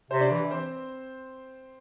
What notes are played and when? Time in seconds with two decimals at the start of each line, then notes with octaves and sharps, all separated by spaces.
0.11 C3 C5
0.20 D4 D5
0.31 E3
0.51 C4 C5